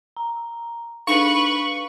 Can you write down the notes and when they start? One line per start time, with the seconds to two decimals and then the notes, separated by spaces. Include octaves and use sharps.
0.17 A#5
1.07 D4 D#4 B4 F5 C#6